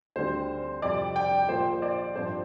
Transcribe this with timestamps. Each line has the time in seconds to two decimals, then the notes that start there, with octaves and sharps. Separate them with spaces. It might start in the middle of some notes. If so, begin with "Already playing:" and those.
0.16 D2 D3 G3 C4 C5
0.82 F2 C3 G3 D5
1.16 G5
1.49 A#1 A#2 F3 A#3 C5
1.82 D5
2.15 G2 F3 C4 C5